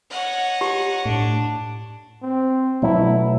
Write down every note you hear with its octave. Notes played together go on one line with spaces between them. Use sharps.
C#5 D#5 F#5
G4 A#5
A2 D4
C4
B2 F#3 A3 E4